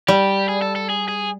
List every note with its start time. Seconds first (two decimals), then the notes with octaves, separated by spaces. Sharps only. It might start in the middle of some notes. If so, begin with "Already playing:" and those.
0.08 G3 G4
0.49 G#4
0.62 A4
0.76 A4
0.90 G#4
1.09 G#4